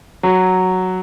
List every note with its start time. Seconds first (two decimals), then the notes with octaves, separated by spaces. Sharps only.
0.23 F#3